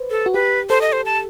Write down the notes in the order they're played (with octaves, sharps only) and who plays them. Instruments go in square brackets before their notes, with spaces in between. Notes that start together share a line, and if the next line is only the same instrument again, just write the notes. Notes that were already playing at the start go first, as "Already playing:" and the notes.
Already playing: [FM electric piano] B4 C5
[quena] A4
[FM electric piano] F#4
[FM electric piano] G4 [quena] B4
[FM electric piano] A4 [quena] C5
[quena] D#5
C5
A5